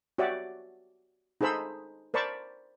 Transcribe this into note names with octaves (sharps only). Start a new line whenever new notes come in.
F#4 G4 C#5 D5 E5 F#5
D#4 G#4 A4 C5 B5 E6
A#4 C5 D5 A5 B5 C#6